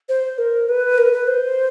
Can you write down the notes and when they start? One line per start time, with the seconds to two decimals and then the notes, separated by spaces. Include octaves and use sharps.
0.09 C5
0.38 A#4
0.68 B4
0.98 A#4
1.12 B4
1.27 C5